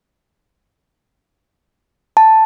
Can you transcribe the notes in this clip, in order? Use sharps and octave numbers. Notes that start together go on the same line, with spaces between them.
A5